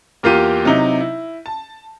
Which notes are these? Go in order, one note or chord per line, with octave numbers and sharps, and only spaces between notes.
E2 A#3 F4 G4 D#7
C3 F#3 D#4 E4
E4
A5